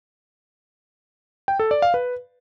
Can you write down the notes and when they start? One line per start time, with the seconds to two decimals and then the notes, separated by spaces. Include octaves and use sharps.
1.48 G5
1.59 A4
1.71 D5
1.82 F5
1.94 B4